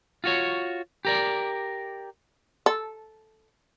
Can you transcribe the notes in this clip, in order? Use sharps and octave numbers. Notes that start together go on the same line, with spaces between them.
F4 F#4 C#5
G4 A#4 D5
A4